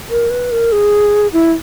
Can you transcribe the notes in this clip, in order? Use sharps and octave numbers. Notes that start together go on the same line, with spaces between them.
A#4
B4
A#4
G#4
E4